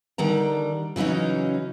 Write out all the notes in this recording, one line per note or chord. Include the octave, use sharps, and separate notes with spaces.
D3 D#3 G3 A#5
C#3 E3 F#3 C#4 D#4